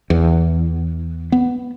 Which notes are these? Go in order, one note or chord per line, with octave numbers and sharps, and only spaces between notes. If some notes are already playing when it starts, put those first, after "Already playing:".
E2
B3